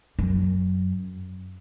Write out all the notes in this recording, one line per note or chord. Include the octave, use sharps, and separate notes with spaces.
F#2